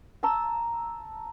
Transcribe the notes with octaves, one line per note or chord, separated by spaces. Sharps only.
A5 A#5 E6